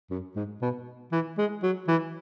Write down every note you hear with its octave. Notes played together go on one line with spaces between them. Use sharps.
F#2
G#2
B2
E3
G#3
F#3
E3